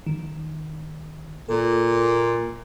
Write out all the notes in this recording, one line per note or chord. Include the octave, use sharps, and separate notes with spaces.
D#3
A#2 A4